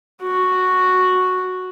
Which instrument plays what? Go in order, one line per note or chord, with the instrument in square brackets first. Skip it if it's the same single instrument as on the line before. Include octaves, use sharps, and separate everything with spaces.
[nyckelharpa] F#4